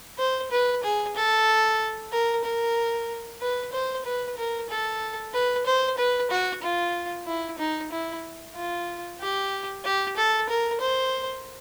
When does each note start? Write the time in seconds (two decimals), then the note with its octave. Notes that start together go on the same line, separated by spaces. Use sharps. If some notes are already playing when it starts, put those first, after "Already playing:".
0.18 C5
0.52 B4
0.84 G#4
1.16 A4
2.12 A#4
2.44 A#4
3.41 B4
3.72 C5
4.06 B4
4.37 A#4
4.70 A4
5.34 B4
5.66 C5
5.98 B4
6.31 F#4
6.63 F4
7.27 E4
7.59 D#4
7.92 E4
8.55 F4
9.20 G4
9.85 G4
10.17 A4
10.49 A#4
10.81 C5